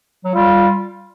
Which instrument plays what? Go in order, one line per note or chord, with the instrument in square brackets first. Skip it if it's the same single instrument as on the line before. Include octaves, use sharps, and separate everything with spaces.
[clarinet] F#3
[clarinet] G3 [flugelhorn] F4